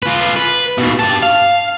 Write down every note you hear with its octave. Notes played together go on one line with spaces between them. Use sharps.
F4 B4
B4
D#2 B2
G2 A5
F5